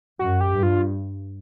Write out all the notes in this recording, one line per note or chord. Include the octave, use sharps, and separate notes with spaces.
F#2 F#4
G4
G2
F4